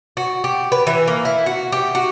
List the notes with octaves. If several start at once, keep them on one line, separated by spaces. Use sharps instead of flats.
F#4
G4
B4
E3
A#3
E4
F#4
G4
F#4